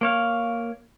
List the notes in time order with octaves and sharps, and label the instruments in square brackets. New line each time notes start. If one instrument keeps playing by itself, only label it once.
[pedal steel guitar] A#3 C#5 F5